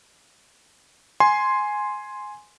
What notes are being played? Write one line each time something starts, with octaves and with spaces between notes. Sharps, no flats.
G#5 C6